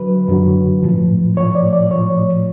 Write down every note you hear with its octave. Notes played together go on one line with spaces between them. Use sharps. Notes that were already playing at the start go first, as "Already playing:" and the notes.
Already playing: D3 F#3 B4
F#2 D3 F#3
A2 F3
A2 F3 C#5
D5
D5
A2 F3 C#5